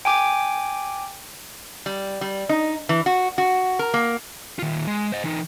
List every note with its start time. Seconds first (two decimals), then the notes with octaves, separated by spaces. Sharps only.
0.05 G5 G#5 D6
1.86 G3
2.21 G3
2.49 D#4
2.89 E3
3.06 F#4
3.38 F#4
3.79 A#4
3.94 A#3
4.59 D#3 F4
4.87 G#3
5.12 C5 D#5
5.24 E3 D#4